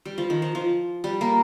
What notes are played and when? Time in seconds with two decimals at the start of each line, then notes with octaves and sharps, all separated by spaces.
0.05 G3
0.18 F3
0.30 D#3
0.42 F3
0.55 F3
1.04 G3
1.21 A#3